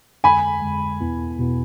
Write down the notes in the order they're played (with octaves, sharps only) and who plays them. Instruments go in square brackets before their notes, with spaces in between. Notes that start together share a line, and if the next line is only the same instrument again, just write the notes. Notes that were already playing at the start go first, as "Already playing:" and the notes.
[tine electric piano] F2 D3 G#3 [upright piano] G#5 B5
[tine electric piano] F2 D3 G#3
E2 B2 B3 E4
E2 B2 B3 E4